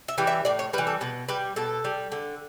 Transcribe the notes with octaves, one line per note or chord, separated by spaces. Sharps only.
E5
E3 G3
E5
A2 D5
C#5
E3 G3 B4
A4
B2 B4
G3 B4
B2 A4
G3
D3